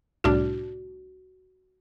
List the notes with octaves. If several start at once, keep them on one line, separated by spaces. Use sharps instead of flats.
C2 A2 D4 F#4